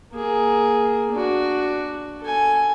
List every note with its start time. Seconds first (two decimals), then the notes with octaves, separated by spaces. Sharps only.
0.13 A#3 G#4
1.12 D4 F#4
2.21 A4 G#5